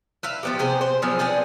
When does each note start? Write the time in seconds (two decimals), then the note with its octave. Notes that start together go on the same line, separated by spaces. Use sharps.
0.23 B4 E5 F5
0.43 F3 B3 G4
0.59 C3 B3 G#4 C5
0.81 C5
1.02 F3 F#3 B3 G#4
1.19 B3 C4 D4 G#4